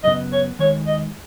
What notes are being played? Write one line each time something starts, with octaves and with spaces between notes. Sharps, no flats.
F#2 C#3 B3 D#5
C#5
D#2 D#3 G#3 C#5
D#5